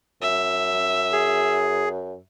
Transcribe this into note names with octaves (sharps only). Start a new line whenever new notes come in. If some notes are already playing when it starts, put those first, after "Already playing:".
F#2 E5
G#4